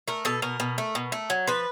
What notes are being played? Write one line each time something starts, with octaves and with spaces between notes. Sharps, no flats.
A3 A#4
B2 A4
B2 A#4
B2
A3
B2
A3
F#3
F3 B4